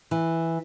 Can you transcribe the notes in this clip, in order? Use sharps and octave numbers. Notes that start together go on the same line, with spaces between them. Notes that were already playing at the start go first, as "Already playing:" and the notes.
E3